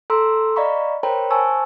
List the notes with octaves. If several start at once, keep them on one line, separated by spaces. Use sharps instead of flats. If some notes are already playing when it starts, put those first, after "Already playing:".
A4 A#5 C6 E6
D5 D#5 F5 A#5 B5 C#6
A#4 C5 C#5 G5 A#5 B5
C5 G#5 A5 C#6 E6